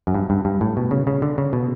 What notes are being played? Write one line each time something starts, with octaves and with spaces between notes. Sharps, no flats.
F#2
G2
G2
G2
A2
B2
C#3
C#3
D3
C#3
B2